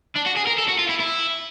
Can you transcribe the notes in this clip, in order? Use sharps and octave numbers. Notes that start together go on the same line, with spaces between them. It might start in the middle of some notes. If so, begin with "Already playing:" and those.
D4
F#4
G#4
A#4
A4
F#4
F4
E4
E4